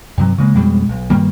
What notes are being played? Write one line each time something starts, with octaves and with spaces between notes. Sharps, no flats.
G2 C3 F#3
C#3 G#3 A#3
F2 B2 G3 G#3
B1
G2 D#3 G3 A#3